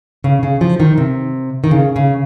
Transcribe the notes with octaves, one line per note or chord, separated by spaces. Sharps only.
C#3
C#3
F3
D#3
C3
D#3
C#3
C#3